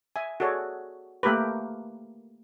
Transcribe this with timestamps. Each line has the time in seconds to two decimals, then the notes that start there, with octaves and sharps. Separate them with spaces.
0.16 E5 G#5
0.40 F#4 G#4 A4 C#5 D5
1.23 A3 A#3 G4 A#4 B4